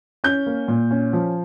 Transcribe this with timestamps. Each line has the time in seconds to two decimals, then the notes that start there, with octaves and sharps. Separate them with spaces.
0.24 C#4 G6
0.46 A#3
0.68 A#2
0.91 C#4
1.13 F3